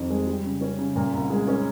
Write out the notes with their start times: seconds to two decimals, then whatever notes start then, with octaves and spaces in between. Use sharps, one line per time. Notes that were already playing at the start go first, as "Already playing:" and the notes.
Already playing: F2 C3 D#3
0.10 G#3
0.27 G3
0.44 C#3
0.61 C#4
0.78 C#3
0.96 A#2
1.12 C2
1.30 G#3
1.47 C#4